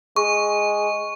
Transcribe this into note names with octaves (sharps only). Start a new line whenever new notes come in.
G#3 C#6